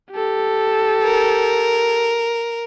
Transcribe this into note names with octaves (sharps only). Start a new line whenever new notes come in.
G4 A4
A#4